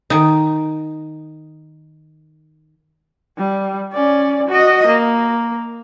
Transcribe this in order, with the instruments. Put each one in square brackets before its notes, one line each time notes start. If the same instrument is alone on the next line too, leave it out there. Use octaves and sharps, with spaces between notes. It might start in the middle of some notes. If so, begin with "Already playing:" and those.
[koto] D#3 D#4
[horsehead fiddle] G3
C#4 D5
F#4 D#5
A#3